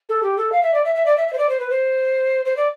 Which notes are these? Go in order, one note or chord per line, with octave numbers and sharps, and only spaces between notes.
A4
G4
A4
F5
E5
D5
E5
E5
D5
E5
E5
C5
D5
C5
B4
C5
C5
D5